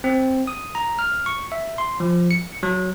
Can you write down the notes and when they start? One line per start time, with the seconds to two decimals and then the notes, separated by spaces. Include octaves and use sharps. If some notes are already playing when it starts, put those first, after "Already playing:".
0.04 C4
0.47 D#6
0.75 A#5
0.99 F6
1.26 C#6
1.52 E5
1.78 C6
2.00 F3
2.31 C#7
2.63 F#3